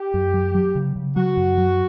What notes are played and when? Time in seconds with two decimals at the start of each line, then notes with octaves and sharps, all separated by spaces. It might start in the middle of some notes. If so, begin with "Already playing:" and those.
Already playing: G4
0.14 F#2
0.34 F#3
0.55 F#3
0.75 C#3
0.96 C#3
1.16 F#3 F#4
1.37 F#2
1.58 F#3